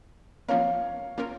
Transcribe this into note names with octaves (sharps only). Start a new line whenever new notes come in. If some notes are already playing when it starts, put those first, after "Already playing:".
F3 A#3 C#4 F4 A#4 C#5 F5
F3 A#3 C#4 F4 A#4